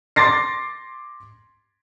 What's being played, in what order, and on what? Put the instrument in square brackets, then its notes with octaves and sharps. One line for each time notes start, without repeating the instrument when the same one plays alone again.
[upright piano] C6 D6 A6 A#6 C7